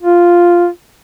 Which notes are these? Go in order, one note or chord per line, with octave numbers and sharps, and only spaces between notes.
F4